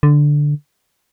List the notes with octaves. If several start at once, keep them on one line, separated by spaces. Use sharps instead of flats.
D3